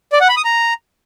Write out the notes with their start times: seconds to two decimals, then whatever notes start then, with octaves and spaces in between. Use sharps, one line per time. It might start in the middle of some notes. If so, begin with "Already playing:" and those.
0.13 D5
0.21 F#5
0.29 B5
0.37 D#6
0.45 A#5